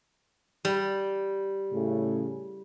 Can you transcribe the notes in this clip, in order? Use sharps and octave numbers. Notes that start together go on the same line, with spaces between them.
G3
A2 C#3